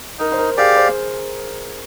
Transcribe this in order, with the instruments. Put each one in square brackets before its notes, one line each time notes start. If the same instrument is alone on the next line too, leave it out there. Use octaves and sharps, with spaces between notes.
[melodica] D#4 [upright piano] A#4
[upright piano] C5
A#4
[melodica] G4 D5 F5 [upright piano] G#4
[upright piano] C5